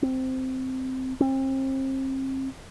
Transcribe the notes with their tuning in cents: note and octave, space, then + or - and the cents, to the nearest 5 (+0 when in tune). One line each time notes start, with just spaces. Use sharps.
C4 -10
C4 +35